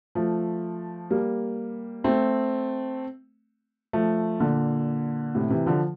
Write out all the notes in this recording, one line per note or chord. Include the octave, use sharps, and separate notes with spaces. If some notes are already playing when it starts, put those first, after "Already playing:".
F3 A3
G3 A#3
A3 C4
F3 A3
A#2 D3
A2 C3
C3 E3
D3 F3